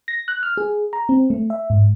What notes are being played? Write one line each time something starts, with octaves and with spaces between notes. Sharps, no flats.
A#6
F#6
F6
G#4
A#5
C4
A3
E5
G#2